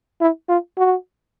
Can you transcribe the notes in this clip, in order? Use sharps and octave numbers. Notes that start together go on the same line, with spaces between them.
E4
F4
F#4